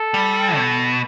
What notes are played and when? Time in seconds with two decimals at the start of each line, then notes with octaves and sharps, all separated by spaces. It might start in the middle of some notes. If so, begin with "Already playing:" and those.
Already playing: A4
0.14 G3
0.57 B2